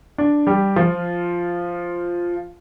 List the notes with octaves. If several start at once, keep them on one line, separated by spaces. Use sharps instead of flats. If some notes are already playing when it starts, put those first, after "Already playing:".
D4
G3 G4
F3 F4